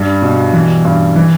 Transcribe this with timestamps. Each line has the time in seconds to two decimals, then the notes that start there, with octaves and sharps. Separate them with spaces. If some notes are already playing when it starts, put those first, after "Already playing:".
Already playing: G2 G3
0.22 B2
0.53 E3
0.85 G2
1.16 E3